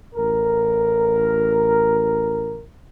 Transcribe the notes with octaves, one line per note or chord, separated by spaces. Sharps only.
A1 A#4